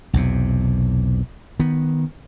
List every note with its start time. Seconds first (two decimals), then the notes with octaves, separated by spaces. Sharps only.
0.14 B1 E2 C3
1.60 D#3 B3